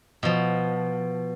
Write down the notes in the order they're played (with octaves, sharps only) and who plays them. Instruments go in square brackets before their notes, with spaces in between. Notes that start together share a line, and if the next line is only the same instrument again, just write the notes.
[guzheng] B2 F3